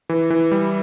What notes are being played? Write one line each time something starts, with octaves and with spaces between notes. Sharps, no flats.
E3
E3
G3